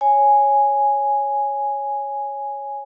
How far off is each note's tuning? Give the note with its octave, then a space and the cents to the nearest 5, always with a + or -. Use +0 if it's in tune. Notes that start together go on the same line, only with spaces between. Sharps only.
C#5 +0 G#5 +0